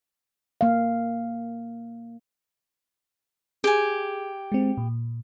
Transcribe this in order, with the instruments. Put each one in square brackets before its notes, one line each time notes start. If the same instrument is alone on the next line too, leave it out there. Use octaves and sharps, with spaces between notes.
[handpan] A#3 F5
[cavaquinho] G4 G#5 [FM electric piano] G#4
[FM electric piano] G#3 C4
A#2